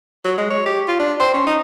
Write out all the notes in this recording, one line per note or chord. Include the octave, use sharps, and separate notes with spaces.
F#3
G#3
C#5
G4
F4
D4
C5
C#4
D#4